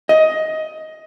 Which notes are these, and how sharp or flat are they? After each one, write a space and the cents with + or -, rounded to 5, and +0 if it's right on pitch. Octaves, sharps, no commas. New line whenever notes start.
D#5 +15